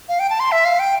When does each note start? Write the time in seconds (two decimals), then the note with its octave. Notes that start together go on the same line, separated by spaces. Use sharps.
0.09 F5
0.19 G5
0.30 A5
0.40 C6
0.52 E5
0.65 F5
0.79 G5